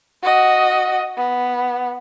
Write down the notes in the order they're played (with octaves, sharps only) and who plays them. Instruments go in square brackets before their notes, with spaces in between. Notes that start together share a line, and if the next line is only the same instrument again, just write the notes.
[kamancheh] F#4 D#5
B3